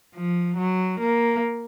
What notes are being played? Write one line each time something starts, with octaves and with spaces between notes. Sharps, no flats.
F3
F#3
A#3